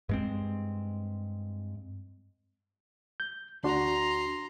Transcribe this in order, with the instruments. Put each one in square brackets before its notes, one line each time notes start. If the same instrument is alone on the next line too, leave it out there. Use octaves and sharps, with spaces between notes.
[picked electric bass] G2 G#3 C4
[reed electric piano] G6
[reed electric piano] D2 D4 F#4 [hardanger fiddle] A#5 C6